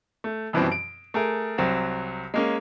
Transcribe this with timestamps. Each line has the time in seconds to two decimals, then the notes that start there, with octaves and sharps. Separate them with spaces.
0.24 A3
0.53 F#2 B2 E3 F3 G3 C4
0.72 D7
1.14 A3 G#4 A#4
1.58 C2 F#3 C4
2.34 G#3 A#3 C#4